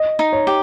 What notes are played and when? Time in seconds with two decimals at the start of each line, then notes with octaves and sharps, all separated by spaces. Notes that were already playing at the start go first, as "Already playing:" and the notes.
Already playing: D#5
0.19 D#4
0.33 C#5
0.47 G4